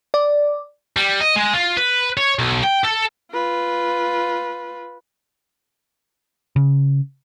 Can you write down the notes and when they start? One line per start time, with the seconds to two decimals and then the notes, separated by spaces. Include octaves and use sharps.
0.14 D5
0.96 G3
1.21 D#5
1.36 G#3
1.53 F4
1.77 B4
2.17 C#5
2.39 B1
2.63 G5
2.84 A4
3.32 F4 B4
6.56 C#3